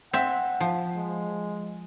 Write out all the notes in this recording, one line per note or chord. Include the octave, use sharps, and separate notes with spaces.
C4 E5 F#5
F3
G#3